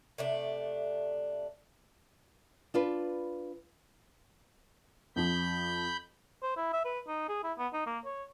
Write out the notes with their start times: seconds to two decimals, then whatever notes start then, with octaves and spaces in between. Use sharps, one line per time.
0.18 C3 A3 D4
2.74 D4 F4 B4
5.16 F2 F3 B5 G6
6.43 C5
6.57 E4
6.73 E5
6.85 B4
7.07 D#4
7.29 G#4
7.44 E4
7.58 B3
7.73 D#4
7.87 A#3
8.05 C#5